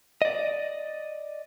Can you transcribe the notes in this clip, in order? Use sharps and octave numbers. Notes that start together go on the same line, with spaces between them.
D5 D#5